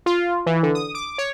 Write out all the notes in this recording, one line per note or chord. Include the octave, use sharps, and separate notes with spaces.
F4
E3
D3
D#6
D6
C#5